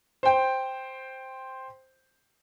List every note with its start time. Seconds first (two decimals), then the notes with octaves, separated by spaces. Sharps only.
0.23 C5 G5